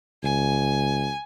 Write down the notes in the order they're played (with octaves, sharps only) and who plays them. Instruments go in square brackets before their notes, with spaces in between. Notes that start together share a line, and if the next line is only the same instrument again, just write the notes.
[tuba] C#2 [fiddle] G#5